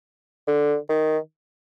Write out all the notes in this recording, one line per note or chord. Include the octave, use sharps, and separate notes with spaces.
D3
D#3